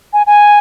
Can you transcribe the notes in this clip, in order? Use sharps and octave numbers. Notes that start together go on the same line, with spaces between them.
G#5
G#5